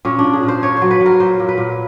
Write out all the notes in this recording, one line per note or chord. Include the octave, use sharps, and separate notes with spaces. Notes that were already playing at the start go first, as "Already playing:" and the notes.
A#2 C#4
D4
A#2
G#4
A#2
C5
A#2 C#5
F#3 C5
B4
F#3
A#4
A#2 C5
A#2
B4
A#2